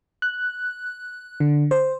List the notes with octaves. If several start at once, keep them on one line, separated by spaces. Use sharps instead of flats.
F#6
D3
C5